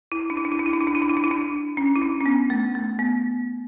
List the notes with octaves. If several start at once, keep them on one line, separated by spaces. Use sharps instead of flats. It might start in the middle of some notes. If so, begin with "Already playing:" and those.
E4
D4
E4
D4
E4
D4
E4
D4
E4
D4
E4
D4
E4
D4
E4
D4
C#4
E4
D4
C#4
B3
A3
A3
B3